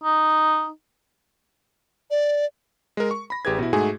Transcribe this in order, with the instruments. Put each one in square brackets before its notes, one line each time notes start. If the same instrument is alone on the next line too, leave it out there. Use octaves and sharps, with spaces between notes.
[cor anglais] D#4
[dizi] D5
[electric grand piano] G#3 A#4
C#6
B5 A#6
A1 G4 G#4 B4 G#6
B2 E4
G#2 A3 F#4 G#4 G#5